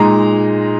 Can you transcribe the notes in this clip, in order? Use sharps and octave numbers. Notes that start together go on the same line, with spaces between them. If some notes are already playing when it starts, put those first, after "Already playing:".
Already playing: A#2 G#3 D#4 A#5